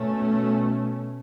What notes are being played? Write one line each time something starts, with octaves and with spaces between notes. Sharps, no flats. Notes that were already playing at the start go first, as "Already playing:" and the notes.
Already playing: B2 A3 C#4